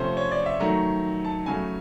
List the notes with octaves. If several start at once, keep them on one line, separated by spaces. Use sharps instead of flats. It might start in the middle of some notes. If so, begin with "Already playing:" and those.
Already playing: C3 F3 A3 C#4 C5 C#5
C#5
D5
E5
D#3 F#3 A3 A#5
A5
C#3 F#3 A3 G#5